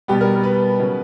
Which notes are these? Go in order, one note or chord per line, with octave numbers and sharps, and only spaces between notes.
B2 G3 B3 G4
A#4
B4
C#3 F#3 C#4